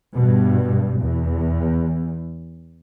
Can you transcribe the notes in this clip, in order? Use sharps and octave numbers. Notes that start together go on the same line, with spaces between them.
G2 B2
E2